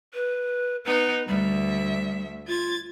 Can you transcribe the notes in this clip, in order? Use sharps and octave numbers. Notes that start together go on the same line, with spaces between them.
B4
B3 D#4 B4
D2 G3 E5
F4 G#6 A6